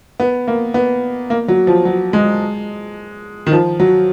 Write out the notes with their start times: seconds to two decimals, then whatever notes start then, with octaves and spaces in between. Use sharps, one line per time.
0.20 B3
0.48 A#3
0.74 B3
1.30 A#3
1.48 F#3
1.67 F3
1.85 F#3
2.13 G#3
3.47 D#3
3.52 F3
3.80 F#3